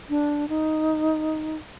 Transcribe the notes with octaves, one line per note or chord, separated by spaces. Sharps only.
D4
D#4